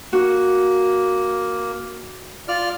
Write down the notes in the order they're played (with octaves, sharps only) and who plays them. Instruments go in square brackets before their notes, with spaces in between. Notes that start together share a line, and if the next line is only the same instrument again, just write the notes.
[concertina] A#3 [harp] F#4
[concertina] F4 D5 F6